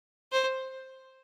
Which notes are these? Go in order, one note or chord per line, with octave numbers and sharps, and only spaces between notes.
C5